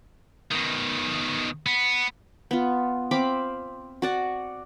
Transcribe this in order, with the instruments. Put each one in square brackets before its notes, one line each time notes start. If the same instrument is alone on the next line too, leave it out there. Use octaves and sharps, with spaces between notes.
[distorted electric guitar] B2 D#3
B3
[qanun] B3 F4
C4 F5 B5 D6
F#4 D5 F#5